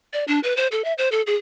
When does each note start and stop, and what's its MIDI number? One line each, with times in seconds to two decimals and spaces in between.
0.13 0.24 74
0.28 0.40 62
0.43 0.56 71
0.57 0.67 72
0.72 0.84 69
0.84 0.93 76
0.98 1.09 72
1.12 1.22 69
1.27 1.36 68